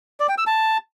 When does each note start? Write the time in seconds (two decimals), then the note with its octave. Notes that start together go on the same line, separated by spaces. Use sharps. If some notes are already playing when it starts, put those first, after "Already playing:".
0.20 D5
0.29 G5
0.38 E6
0.47 A5